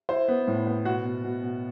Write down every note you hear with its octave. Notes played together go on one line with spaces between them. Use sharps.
E4 C5
B3
A2
B3
B2 F#4
B2
B2
B2